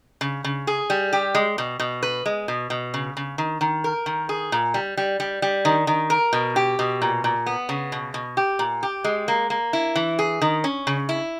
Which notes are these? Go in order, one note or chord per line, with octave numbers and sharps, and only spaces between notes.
C#3
C#3
G#4
G3
G4
G#3
B2
B2
B4
G#3
B2
B2
C#3
C#3
D#3
D#3
A#4
D#3
G#4
A#2
G3
G3
G3
G3
D#3
D#3
A#4
B2
G4
B2
A#2
A#2
B3
C#3
B2
B2
G4
A#2
G4
G#3
A#3
A#3
E4
E3
G#4
D#3
C#4
C#3
E4